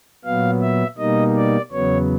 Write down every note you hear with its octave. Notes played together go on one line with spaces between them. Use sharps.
A#2 F#3 B3 F5
E5
B2 G3 A#3 D#4 D#5
D5
E2 C#3 F#3 B3 C#5